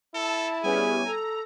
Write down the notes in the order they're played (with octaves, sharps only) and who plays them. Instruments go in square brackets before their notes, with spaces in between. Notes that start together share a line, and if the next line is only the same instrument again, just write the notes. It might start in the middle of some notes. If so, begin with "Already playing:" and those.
[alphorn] E4 [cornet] A4 [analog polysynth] A5
[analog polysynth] G3 B3 C#4 [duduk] G#4 [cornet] G#5
[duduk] A4 [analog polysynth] A#5